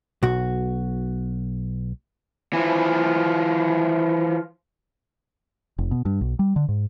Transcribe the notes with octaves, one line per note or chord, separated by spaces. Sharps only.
B1 F#4
E3 F3
F1
B2
G2
B1
G3
D3
G#2